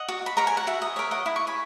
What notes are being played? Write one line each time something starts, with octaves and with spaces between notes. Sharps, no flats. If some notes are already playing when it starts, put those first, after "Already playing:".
Already playing: D#5 F#5
F#4
B5
A#4 C#5 A#5
G#5
F#5
F#4 E5
D#5
A#4 C#5 E5
D#5 F#5
E4 B5
C#6
G#5 B5